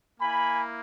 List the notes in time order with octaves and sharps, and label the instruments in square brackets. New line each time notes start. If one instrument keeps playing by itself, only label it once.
[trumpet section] A#3 E4 G#5 B5